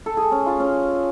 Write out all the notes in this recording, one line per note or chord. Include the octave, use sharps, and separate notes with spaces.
A4
G#4
C#4
F4
C#4